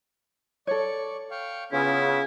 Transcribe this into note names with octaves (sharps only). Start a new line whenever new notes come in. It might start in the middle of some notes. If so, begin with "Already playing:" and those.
A4 C#5 D5 C#6
F5 G5 C#6
C#3 B3 C#4 E4 F4